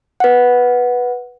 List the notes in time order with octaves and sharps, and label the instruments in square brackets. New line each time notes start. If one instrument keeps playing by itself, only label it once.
[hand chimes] B4 F#5